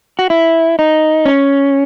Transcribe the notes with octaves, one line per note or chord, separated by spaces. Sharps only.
F#4
E4
D#4
C#4